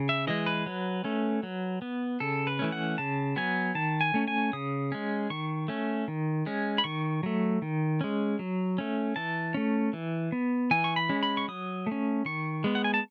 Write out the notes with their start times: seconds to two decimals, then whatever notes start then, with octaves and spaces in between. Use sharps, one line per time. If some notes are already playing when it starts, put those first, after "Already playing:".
Already playing: C#3
0.09 E5
0.27 E3 G#3 D#5
0.46 B4
0.66 F#3
1.04 A3 C#4
1.43 F#3
1.82 B3
2.20 C#3 A4
2.47 B4
2.59 E3 A3 C#4
2.72 F#5
2.98 C#3 A5
3.36 F#3 B3 G#5
3.75 D#3 A5
4.01 G#5
4.14 A3 C#4
4.28 G#5
4.53 C#3 D#6
4.92 G#3 C#4
5.30 D#3 C#6
5.68 A3 C#4
6.08 D#3
6.46 G#3 C#4
6.78 B5
6.84 D#3 C#6
7.23 F#3 A3
7.62 D#3
8.01 G#3 C#4
8.39 F#3
8.78 A3 C#4
9.16 E3 A5
9.54 A3 C#4
9.93 E3
10.32 B3
10.71 E3 G#5
10.84 C#6
10.96 B5
11.09 G#3 C#4
11.23 B5
11.37 C#6
11.48 F#3 D#6
11.86 A3 C#4
12.25 D#3 C#6
12.64 G#3 B3
12.75 F#5
12.84 G#5
12.94 A5